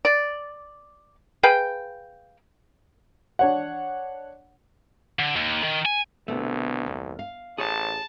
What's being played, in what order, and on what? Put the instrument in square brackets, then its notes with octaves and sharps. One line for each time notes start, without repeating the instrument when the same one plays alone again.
[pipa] D5
G#4 B4 F5 G5
[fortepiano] D4 C#5 F#5
[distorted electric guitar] D3
D#2
D#3
G#5
[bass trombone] C2 [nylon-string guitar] B2 D3 B3 [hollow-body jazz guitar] A3
[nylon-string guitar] E2
F5
[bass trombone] A1 [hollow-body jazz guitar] G#4 C#5 [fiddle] A5